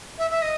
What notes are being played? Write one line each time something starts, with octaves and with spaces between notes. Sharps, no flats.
E5
E5
D#5